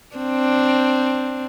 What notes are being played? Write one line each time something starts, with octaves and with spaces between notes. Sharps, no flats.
C4 D4